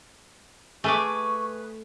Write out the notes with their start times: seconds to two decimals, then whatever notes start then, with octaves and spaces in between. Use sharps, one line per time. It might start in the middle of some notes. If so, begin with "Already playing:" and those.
0.84 A3 G#4 B4 C#6 D6